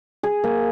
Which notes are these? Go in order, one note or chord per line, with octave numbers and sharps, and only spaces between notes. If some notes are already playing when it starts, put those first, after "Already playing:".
G#4
A#3